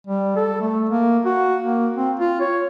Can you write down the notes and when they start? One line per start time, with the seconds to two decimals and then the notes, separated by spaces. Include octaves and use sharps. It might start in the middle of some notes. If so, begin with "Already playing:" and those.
0.07 G3
0.36 A4
0.61 A3
0.90 A#3
1.25 F#4
1.62 A#3
1.97 C4
2.20 F4
2.40 C#5